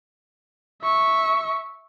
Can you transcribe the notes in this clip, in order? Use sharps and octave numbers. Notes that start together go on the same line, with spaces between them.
E5 C#6